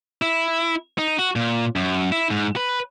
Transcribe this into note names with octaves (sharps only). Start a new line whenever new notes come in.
E4
D#4
F#4
A#2
F#2
E4
G#2
B4